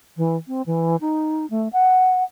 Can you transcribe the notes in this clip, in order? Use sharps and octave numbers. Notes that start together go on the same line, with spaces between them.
E3
C4
E3
D#4
A3
F#5